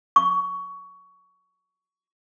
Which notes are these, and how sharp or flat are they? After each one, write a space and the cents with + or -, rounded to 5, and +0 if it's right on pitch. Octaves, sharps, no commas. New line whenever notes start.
C#6 +20